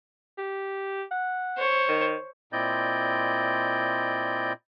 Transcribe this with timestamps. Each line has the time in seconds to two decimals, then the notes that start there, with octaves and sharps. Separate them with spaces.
0.38 G4
1.11 F#5
1.57 C5 C#5
1.89 D#3
2.53 A#2 C4 E4 D5 D#5 G6